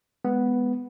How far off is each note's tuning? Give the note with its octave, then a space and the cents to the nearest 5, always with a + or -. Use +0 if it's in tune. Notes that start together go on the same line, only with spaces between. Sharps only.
G#3 -10 B3 +0